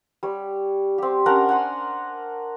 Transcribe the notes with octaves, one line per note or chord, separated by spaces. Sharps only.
G3 C#5
C4 G4
C#4 D4 A#4 F#5
F#5 G#5 C6 E6